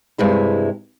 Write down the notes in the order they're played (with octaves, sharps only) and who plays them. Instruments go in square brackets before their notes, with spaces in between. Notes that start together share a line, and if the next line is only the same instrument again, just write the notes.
[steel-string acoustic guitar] G2 C3 G#3 E4